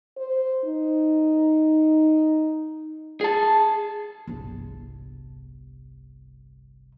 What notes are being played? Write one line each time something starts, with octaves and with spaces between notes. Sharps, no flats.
C5
D#4
G#4 A5
G1 C2